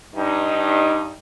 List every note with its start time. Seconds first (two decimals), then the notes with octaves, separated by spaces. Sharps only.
0.15 G2 D#4